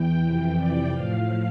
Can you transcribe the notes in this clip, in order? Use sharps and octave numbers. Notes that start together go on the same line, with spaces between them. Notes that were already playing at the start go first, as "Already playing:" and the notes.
Already playing: E2 E3 G5
F2 C3 E3 G5
D5
A2 F3 F5